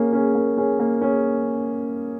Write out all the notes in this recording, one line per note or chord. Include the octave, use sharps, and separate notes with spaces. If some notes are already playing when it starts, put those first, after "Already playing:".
Already playing: A#3 C#4 G#4
C#4 G#4
A#3
C#4 G#4
A#3
C#4 G#4